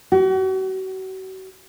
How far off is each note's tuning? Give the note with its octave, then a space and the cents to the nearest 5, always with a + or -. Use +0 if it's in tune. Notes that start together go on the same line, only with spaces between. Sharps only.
F#4 +35